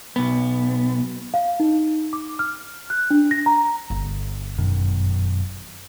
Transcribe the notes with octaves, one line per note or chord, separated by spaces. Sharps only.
B1 B3
F5
D#4
D6
F6
F#6
D4
A#6
A#5
G1
F#2 B2 D#3